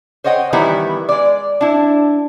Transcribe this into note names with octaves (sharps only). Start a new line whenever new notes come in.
C5 C#5 D#5 F#5 G5
D#3 E3 G3 B3 E4
G#3 D5
D4 E4